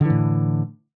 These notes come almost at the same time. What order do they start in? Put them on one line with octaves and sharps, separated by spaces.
D3 E3 A2